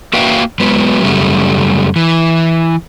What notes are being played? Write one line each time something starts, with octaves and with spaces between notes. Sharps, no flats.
A#3 F#4 B4 E5 F5 G5
F#3 G#3 B3 B4
F#2 C#3 G3 A3
E3